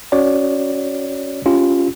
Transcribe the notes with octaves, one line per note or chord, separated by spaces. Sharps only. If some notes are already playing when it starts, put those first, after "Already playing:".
C#4 F#4 C#5 D5
C#4 F4 G4